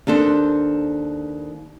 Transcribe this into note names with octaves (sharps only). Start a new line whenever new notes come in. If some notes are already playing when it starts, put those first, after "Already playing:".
D#2 D4 A4 C5